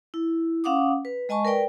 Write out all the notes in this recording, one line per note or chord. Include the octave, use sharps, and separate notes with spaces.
E4
C#4 F5 F#5 D6 D#6
B4
G#3 D#5 G#5 A5 C#6
A#4 B4 D5 G5